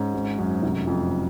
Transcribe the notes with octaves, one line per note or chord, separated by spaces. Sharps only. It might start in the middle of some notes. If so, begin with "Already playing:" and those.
Already playing: G#2 C#4
G#1
F#2
F1
F2